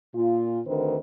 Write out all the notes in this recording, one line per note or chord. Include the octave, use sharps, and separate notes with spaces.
A#2 F4
D2 D3 D#3 C4 B4 C5